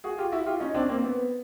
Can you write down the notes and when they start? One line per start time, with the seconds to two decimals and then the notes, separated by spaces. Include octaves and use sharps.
0.04 F#4 G#4
0.18 F4 G4
0.32 E4 F#4
0.46 F4 G4
0.60 C#4 D#4
0.74 C4 D4
0.89 A#3 C4
1.03 B3